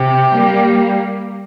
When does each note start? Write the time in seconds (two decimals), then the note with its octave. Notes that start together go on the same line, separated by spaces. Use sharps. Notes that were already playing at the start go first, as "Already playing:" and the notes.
Already playing: C3 G4
0.34 G3 A#3